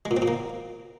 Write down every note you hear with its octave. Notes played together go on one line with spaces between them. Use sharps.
G#3
A#2
C4
A#2
A#3